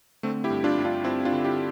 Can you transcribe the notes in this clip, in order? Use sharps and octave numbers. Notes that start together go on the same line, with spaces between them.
D3 A3 C4
E4 G4
G2
D4 F4
G2
D4 F4
G2 C4 E4
D4 F4
D3
E4 G4